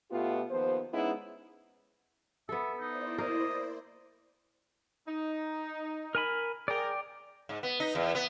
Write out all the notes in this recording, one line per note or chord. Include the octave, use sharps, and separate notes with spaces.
B2 A3 B3 F4 G4
D#2 F3 B3 C5
G#3 B3 C#4 D#4 E4
B3 A4 E5
D#4 E4 C5 D5
A#3 A#4 D#5
D#4
A#4 G#5 B5
G#4 A#4 D5 G5
G#2
B3
D#4
E2
B3